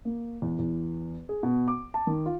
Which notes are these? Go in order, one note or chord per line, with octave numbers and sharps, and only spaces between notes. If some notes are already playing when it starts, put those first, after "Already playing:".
A#3
E2
E2
G#4
B2
D6
A5
D#3
F4